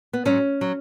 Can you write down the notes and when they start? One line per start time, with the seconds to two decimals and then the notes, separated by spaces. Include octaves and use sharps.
0.13 B3
0.25 G#2 F#3 C#4
0.61 F#3